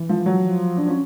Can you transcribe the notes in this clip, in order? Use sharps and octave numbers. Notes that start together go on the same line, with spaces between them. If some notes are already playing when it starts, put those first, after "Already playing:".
Already playing: E3
F3
F#3
F3
D4
C#4